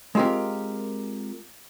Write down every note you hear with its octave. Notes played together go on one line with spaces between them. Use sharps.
G#3 C4 F4 G4 A#4